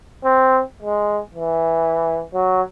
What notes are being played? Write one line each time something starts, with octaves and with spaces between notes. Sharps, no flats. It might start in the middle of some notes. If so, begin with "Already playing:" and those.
C4
G#3
E3
F#3